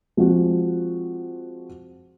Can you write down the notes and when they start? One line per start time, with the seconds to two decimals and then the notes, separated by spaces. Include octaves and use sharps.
0.17 F3 G#3 C4 F#4